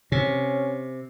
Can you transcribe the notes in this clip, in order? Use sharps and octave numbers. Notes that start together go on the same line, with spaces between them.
C3 C#4